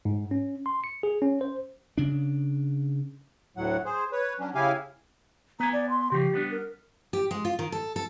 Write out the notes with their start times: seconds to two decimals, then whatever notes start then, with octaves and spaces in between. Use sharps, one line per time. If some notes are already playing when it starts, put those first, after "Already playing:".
0.05 G#2
0.31 C#4
0.66 C6
0.84 C#7
1.03 G#4
1.22 C#4
1.41 C5
1.98 C#3 D4
3.57 D2 A2 F#3 F#5
3.85 G#4 C5
4.12 B4 C#5
4.40 F#3 C#4 D4
4.55 C#3 E4 G4 F5 G#5
5.60 B3 G#5 A#5
5.73 D5
5.90 C6
6.12 C#3 F3 G4
6.33 G3 B3 D4
6.51 A#4
7.13 G4
7.31 G#3
7.45 F4
7.59 D#3
7.72 A4
7.96 A4